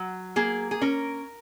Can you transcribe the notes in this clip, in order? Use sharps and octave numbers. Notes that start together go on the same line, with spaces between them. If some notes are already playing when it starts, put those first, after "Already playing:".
Already playing: F#3
A#3 G#4
G#4
C#4 A#4